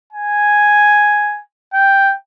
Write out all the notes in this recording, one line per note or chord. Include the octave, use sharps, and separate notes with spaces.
G#5
G5